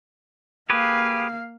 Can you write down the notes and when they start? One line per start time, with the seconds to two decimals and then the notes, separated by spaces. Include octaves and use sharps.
0.70 A#3 G4 G#4 B4 F5